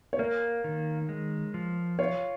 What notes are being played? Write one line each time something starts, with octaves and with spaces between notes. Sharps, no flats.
C#5
A#3 A#4
D#3
G#3
F3
F4 C#5